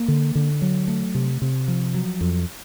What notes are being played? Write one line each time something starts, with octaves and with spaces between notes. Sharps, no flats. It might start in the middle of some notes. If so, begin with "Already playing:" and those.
Already playing: A#3
D3
D3
F#3
A3
C3
C3
F3
F#3
F2